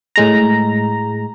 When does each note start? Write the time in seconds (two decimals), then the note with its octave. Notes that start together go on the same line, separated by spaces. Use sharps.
0.16 A2 G#3 A#5